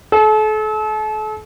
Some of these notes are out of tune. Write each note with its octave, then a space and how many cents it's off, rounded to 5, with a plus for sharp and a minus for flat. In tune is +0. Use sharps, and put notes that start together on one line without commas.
A4 -40